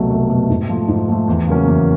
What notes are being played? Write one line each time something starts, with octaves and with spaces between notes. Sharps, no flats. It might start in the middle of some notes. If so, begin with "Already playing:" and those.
Already playing: C2 B2 F#3 A3
C2
B2 F#3 A3
G#2
F3 A3
G#2
F3 A3
E2
C#3 F#3 A#3 C#4
E2